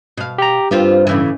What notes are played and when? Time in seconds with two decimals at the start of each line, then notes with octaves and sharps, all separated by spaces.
0.17 B2 F5
0.38 G4 A#5
0.71 G2 C4 F4 G4
1.07 A2 C#3 E3